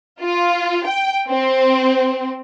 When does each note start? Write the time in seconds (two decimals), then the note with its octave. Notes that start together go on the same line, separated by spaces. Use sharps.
0.20 F4
0.85 G5
1.28 C4